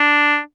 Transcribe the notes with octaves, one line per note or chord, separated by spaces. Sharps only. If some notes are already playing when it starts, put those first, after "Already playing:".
Already playing: D4